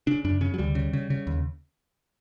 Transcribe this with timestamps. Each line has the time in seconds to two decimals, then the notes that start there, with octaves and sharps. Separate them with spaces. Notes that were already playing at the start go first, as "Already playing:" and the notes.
0.07 C#3 D4
0.25 F#2 D4
0.41 C#3 C#4
0.54 F#3
0.58 D2 G3
0.75 C#3
0.93 C#3
1.10 C#3
1.27 D#2